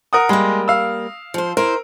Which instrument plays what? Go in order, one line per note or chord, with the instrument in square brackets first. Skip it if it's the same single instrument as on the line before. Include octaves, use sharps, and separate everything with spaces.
[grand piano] A#4 F#5 D#6
[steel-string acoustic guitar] G3 A#3 [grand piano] G#3
[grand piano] F5 E6
[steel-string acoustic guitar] F3 C5
[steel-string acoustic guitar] E4 C5 [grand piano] A#4